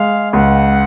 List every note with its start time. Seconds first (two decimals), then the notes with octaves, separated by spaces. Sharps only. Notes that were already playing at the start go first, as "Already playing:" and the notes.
Already playing: G#3 F5
0.33 C#2 F#5